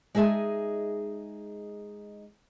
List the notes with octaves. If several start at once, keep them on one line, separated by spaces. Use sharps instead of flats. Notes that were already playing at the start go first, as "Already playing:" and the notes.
G#3 D#4 G#4 E5 A5